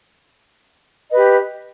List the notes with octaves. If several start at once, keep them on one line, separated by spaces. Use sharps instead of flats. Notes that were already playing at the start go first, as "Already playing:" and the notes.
G4 B4 D#5